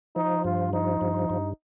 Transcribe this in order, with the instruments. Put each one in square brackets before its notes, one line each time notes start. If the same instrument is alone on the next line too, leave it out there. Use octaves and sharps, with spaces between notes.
[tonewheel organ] F3 [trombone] D#4
[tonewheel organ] G2 [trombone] F4
[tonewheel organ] F3 [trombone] D#4
[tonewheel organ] G2
G2